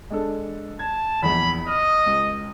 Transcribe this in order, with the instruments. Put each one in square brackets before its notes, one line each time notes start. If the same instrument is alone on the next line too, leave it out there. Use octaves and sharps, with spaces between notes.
[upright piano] G#3 D4 A4
[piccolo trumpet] A5 [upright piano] G#6
[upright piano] A#1 E2 [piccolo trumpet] B5
[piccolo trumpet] D#5 [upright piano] F6
[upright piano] C#2